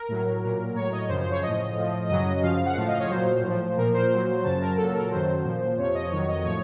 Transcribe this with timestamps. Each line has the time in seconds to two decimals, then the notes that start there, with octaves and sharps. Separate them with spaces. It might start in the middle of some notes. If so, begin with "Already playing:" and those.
Already playing: A#4
0.09 A2 F#3
0.42 A#2 F#3
0.75 A2 F#3 C#5
0.92 D#5
1.09 F#2 C#3 F3 C5
1.21 C5
1.31 C#5
1.42 A2 F3 D#5
1.76 A2 F3
2.09 F#2 C#3 F#3 D#5
2.42 F#2 C#3 F3 F5
2.66 F#5
2.77 A2 F3 F5
2.88 D#5
2.99 C#5
3.10 A#2 F#3 C5
3.43 A2 F3
3.77 A#2 F3 A#4
3.94 C5
4.10 A#2 F#3
4.44 F#2 C#3 F#3 A5
4.61 A#4
4.77 A#2 F#3 A4
4.94 A#4
5.11 F#2 D#3 F#3 C5
5.44 A#2 F3
5.78 F2 C3 F3 C#5
5.95 D#5
6.12 F2 D#3 F#3 C#5
6.28 D#5
6.45 A2 F3 C#5